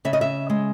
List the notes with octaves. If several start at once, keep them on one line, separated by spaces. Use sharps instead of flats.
C#3 E5
D#5
E5
G#3